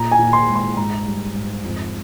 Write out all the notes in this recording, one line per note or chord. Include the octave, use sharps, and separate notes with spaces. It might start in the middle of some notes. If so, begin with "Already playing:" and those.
Already playing: A#2 A#5
G#5
A#2
C6
G#3
C6
G#2 A#5
G3
G#2
F2